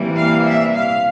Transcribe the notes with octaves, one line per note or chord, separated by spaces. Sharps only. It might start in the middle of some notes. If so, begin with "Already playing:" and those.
Already playing: C3 E3 G3 A#3
F5
E5
F5